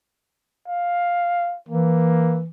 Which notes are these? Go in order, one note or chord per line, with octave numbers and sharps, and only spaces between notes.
F5
E3 A#3